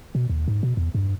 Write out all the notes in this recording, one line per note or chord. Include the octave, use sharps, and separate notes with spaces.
B2
D#2
G#2
B2
E2
G2